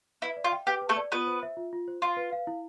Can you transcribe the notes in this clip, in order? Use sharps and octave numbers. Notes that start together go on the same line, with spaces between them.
E4 B4
D5
F4
G5
G4 B4
B4
A3 A4
D5
B3 F4 B4
C5
E5
F4
F4
C5
F4 C6
B4
F5
E4